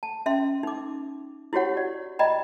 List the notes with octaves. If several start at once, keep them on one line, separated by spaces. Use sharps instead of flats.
A5
C#4 E5 C6
D#4 D6
E4 F#4 G4 C#5 F#5
D5
D5 D#5 G5 A#5 B5